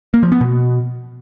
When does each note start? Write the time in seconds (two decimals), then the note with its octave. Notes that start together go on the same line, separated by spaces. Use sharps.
0.14 A#3
0.23 F3
0.32 B3
0.41 B2